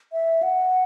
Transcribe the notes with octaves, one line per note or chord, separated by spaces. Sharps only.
E5
F#5